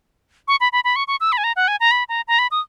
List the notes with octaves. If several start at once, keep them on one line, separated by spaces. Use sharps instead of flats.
C#6
B5
B5
B5
C#6
C#6
E6
B5
G#5
A#5
F#5
G#5
A#5
B5
A#5
A#5
B5
D#6